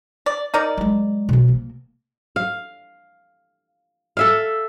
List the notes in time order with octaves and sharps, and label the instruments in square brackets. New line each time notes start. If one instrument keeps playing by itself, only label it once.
[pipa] D5
D#4 A#4 D5
[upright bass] F#3 G#3
B2 F3
A#3
[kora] F5
A4 E5 F5